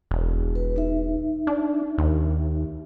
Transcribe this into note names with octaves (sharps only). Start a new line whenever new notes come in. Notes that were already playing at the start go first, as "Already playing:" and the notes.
E1
B4
D#4 E5
D4
D#2